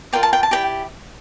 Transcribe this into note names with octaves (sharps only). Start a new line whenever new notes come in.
F4 A#4 D5 G5
A5
G5
A5
E4 G4 D5 G5